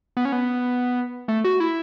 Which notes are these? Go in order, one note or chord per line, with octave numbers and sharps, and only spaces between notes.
B3
C#4
B3
A3
F#4
E4